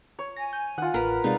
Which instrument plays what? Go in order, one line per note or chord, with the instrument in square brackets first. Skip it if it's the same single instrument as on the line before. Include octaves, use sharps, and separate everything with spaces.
[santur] C#5
[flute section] G#5 [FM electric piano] A#6
[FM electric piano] G6
[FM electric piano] D#3 [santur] F4 F#5
[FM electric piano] A1 [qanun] A#4 B4
[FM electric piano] C3 G#3 [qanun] D#4 F5 [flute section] D5